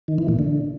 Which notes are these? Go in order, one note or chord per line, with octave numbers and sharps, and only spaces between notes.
D#3
E3
A#2
D3